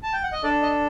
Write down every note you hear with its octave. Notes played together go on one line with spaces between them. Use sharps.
A5
G5
F#5
D#5
D4 A4 D5
D#5